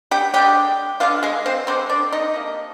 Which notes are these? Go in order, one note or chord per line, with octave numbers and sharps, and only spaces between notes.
G4 G5
D3 G#3 D4 G4 G5
D3 G#3 D4 F4 F5
G#3 G#4
C4 C5
D3 G#3 C4 D4 C5
D4 D5
D#4 D#5
C3 F3 A#3